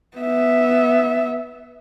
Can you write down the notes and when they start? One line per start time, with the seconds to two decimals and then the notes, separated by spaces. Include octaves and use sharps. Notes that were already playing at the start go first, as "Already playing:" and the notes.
0.18 B3 E5